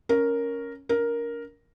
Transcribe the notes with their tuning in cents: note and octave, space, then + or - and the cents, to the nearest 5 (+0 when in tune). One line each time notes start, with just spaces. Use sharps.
C#4 +0 A#4 +0
D4 -40 A#4 +5